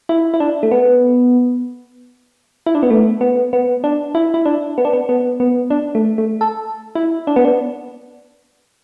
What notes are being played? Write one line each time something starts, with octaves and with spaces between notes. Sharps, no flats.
E4
E4
D4
A3
B3
E4
D4
B3
A3
B3
B3
D4
E4
E4
D4
B3
D4
B3
B3
B3
D4
A3
A3
A4
E4
D4
B3
D4